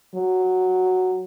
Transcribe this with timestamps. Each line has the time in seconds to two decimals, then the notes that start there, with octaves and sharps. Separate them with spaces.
0.16 F#3